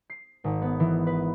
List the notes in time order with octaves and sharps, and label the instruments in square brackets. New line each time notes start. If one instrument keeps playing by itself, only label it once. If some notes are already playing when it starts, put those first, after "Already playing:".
[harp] C7
G#1
B3
E3
B4